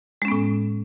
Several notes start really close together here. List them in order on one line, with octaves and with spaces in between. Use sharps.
G#3 C#4 B3 A2